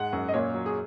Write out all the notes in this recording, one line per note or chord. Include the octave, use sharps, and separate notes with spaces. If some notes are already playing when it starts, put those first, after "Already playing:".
Already playing: G#2 G#3 F#5
F#2
D#5
A#2 C#5
F#3
G#4